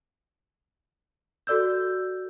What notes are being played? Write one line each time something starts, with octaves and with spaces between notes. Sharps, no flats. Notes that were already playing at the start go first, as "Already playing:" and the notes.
F#4 A4 D5 E6 G6